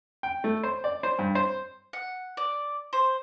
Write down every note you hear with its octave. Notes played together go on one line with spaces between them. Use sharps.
G5
A3
C5
D5
C5
G2
C5
F#5
D5
C5